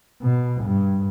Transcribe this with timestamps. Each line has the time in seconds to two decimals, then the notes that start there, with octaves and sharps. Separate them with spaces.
0.22 B2
0.64 G2